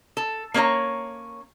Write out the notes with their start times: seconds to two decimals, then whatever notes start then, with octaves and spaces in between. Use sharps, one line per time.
0.17 A4
0.54 A#3 C#4 C#5 D5 A#5